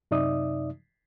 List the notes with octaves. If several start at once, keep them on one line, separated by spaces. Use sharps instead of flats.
F#2 C3 D#4 D5 E5 D#6